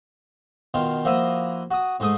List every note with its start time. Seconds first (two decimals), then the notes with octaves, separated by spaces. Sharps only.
0.74 B2 D#3 F4
1.05 F3 A#3 E4 F#4 E5 D#6
1.71 F#4 D#6
2.00 G#2 A3 G#4 D#6